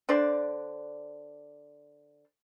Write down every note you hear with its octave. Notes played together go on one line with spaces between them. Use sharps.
D3 D4 C5 D5